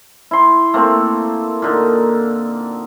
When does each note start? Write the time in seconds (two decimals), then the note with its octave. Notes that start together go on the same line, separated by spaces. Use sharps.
0.31 E4 C6
0.74 A3 A#3 C4
1.62 A#2 D3 D#4